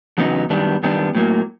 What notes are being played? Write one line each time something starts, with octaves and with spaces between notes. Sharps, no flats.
E2 C#3 F#3 B3 D#4
F#2 D#3 G3 B3 D4
F#2 D#3 G3 B3 D4
A2 F#3 A#3